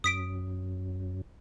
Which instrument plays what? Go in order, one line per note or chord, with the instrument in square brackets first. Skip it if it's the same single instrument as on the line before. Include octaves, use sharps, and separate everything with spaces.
[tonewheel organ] F#2 [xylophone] D#6 B6 D7